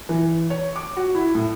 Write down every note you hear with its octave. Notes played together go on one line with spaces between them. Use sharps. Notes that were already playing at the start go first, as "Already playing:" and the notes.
E3
C#5
D6
F#4
E4
A2